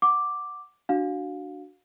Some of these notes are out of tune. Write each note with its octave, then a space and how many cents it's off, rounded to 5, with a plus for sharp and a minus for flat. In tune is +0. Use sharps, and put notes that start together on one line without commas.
F#5 +0 D6 +0
D4 +0 F#4 +0 F5 +30